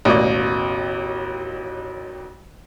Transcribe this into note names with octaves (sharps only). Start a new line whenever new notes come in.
A1 D#2 B2 A#3 D5